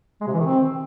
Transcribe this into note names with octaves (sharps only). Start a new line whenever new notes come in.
G#3
C3
E3
D#3
C4